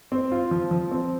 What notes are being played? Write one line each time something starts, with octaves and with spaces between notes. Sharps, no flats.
C4
F4
F3
F3
C4